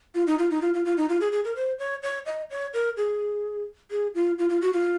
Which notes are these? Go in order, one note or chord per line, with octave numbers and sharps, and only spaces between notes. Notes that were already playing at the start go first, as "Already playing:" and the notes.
F4
D#4
F4
D#4
F4
F4
F4
D#4
F4
G#4
G#4
A#4
C5
C#5
C#5
D#5
C#5
A#4
G#4
G#4
F4
F4
F4
F#4
F4